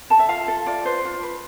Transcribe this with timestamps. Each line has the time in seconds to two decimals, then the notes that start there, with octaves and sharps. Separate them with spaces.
0.10 A4 A5
0.19 E5
0.29 F4 F5
0.48 A4
0.67 F4 D5
0.85 B4 C5
1.05 F4
1.23 B4